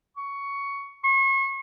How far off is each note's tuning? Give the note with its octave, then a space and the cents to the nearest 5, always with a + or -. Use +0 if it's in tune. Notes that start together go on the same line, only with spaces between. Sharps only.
C#6 +10
C#6 -35